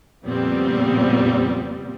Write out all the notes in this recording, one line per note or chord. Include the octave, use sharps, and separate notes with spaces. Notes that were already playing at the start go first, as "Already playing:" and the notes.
F2 A#2 C#3 G3 B3 C4